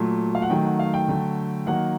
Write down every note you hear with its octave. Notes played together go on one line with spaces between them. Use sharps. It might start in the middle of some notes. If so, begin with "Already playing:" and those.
Already playing: A#2 F#3 A3
F5
F#5
D#3 F#3 A3 G5
F#5
F5
G5
D3 F#3 A3
D#3 F#3 A#3 F#5